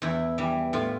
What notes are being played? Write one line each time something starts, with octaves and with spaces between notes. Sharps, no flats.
E2 E4
E3 G3
A2 F4